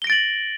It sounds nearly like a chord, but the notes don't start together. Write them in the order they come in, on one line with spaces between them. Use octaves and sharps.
G7 A#6 D7 A6 F#7